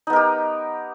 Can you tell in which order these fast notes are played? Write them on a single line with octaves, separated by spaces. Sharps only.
D#4 B3 A#4 G4